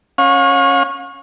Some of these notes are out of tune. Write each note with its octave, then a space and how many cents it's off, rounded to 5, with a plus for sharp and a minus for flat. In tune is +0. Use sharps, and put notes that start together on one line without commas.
C#4 -15 F5 +40